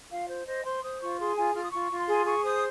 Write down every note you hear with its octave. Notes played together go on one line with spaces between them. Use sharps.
F4 F5
C5
C5 D#5
C5 C6
C5 D#6
F4 C#6
G#4 C6
F4 G#5
F4 F6
D#6
F4 C#6
F4
C6
G#4
G#4 C#6
C5 D#6